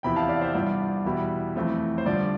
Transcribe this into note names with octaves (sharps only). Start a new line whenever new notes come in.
E2 C3 F3 B3 E4 G5 B5
F5 A5
D5 F5
C5 E5
G2 E3 B3 F4 D5
E2 B2 G3 B3 E4
F2 E3 A3 C4
C5
G2 D3 F3 D5